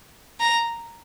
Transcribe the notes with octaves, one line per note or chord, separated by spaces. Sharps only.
A#5